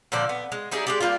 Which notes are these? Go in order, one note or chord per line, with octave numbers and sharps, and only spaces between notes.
A#2 D3 F3 D5
B3
G#3
G3 D#4 E4 G#4
G#3 G4 D5
G3 A#3 D4 F4